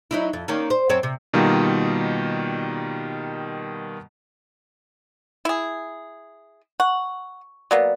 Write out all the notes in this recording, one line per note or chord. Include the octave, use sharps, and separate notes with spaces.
F#3 D#4 E4
F2
D#3 A#3 C#4
C5
F#2 C4 C#5
C3
B2 D#3 G3 A#3 D#4 F4
E4 G#4
F#5 C#6
F#3 A#3 B3 D5